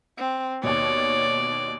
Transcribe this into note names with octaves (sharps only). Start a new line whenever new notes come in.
C4
D#2 B2 C#5 D5